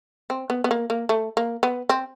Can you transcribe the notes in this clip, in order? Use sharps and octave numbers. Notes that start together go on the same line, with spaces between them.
C4
B3
B3
A#3
A#3
A3
A#3
B3
C4